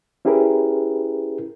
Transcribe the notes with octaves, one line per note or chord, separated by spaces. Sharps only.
C#4 E4 G4 G#4 A#4 B4